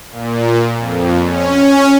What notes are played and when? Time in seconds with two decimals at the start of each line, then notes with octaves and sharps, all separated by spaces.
0.11 A#2
0.79 F2
1.25 C#4